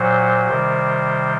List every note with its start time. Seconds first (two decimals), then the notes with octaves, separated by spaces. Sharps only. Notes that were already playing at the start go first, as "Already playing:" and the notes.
Already playing: A#2 F#3 C5
0.48 C3 D#3 G3